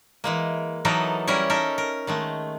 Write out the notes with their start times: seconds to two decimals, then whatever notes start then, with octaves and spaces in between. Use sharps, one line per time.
0.24 E3 G#3 A#3
0.85 E3 F#3 B3 D#4 A4 A#4
1.27 G3 C#4 E4 A#4 C#5
1.50 D#4 A4 A#4 E5
1.78 A#4
2.07 D#3 G#3 A3